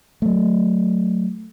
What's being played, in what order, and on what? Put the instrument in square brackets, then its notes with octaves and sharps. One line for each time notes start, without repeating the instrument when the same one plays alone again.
[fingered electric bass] F#3 A3